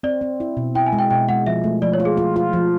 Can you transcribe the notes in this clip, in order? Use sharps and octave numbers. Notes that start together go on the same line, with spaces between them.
C4 D5
C4
E4
B2
E4 G5
G#5
G#3
G5
B2 G5
G#3 F#5
F3 E5
A3
F3 D5
C#5
F4
G#4
F4
F4
F3